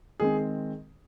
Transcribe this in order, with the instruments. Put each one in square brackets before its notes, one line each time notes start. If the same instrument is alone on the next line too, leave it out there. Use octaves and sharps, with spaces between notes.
[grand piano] D#3 G#3 C4 G#4